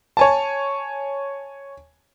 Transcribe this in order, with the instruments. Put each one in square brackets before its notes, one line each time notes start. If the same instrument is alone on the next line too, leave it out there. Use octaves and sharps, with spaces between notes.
[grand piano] C#5 G#5 A5